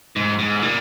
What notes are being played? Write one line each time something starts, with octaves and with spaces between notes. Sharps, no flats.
G#2
G#2
A#2